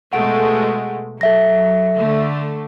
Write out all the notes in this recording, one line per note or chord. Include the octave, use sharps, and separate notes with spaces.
B2 G#3 A3 F#5 D7
F#3 A4 E5 A#6
D3 A3